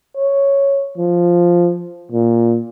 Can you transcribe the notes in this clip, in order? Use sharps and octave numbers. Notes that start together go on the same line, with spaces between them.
C#5
F3
A#2